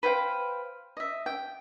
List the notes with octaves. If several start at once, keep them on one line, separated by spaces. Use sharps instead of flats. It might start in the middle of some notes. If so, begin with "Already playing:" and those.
B4 C5 F5 G5
D#5 E5
G5